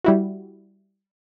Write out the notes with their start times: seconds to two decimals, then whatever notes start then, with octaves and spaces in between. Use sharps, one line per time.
0.04 G3 E4 F#4